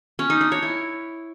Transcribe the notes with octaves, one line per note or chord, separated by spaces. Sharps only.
C#4
D#4
D4
C#5
E4